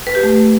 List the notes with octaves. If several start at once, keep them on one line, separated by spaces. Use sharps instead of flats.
B4
G4
A3